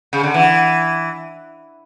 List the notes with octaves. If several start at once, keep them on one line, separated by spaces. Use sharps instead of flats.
C#3
D3
E3